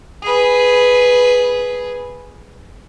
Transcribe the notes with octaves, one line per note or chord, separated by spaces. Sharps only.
G#4 B4